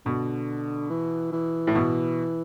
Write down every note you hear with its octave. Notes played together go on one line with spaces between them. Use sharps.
B2 D3
E3
E3
A2
B2 E3